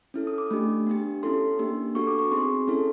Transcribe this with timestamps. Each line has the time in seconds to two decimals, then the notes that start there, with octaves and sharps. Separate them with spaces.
0.14 C#4 E4 A4
0.27 D#6
0.38 D6
0.51 A3 D4 G4
0.87 B3 D4 G4
1.23 C#4 E4 A4 C6
1.59 A#3 D4 G4
1.95 B3 D4 F#4 A4 C#6
2.07 D6
2.19 C#6
2.31 C4 D#4 G#4 C6
2.68 C#4 E4 A4